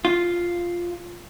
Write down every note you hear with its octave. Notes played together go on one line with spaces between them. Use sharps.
F4